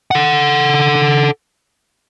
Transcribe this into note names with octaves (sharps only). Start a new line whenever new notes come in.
A4 F#5